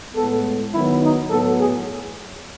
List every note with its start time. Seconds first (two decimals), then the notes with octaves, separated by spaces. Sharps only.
0.15 A2 G#3 B3 A4
0.72 D#3 F#3 B3 E4
1.01 D#4
1.28 A2 F#3 B3 A4
1.58 G#4